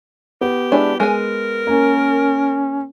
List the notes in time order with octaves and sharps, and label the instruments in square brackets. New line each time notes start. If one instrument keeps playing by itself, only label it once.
[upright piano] B3 [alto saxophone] G4
[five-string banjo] G#3 D4 E4
[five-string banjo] G#3 G#5 [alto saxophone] A#4
[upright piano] A#3 [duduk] C#4